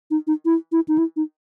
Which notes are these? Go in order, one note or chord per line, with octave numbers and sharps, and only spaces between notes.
D#4
D#4
E4
E4
D#4
E4
D#4